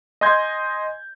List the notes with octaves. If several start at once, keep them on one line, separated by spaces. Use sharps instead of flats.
D#5 G#5 C6 G6 G#6